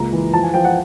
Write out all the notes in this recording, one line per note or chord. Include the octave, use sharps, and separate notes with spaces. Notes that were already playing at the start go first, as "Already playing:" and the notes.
Already playing: C#2 A#3 A#5
E3
F3 A5
G#5
F3 G5
F#5